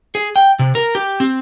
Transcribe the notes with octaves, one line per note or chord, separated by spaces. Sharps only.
G#4
G5
C3
A#4
G4
C4